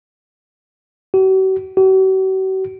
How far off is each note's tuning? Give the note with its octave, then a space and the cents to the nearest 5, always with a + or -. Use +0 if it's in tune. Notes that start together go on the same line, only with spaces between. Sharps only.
F#4 +45
F#4 +45